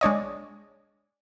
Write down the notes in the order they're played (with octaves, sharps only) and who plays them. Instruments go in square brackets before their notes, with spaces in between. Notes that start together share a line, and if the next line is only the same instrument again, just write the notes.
[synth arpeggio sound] G#3 D4 C#5 D#5